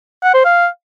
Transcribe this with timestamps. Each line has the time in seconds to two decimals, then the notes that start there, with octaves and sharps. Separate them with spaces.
0.23 F#5
0.34 C5
0.45 F5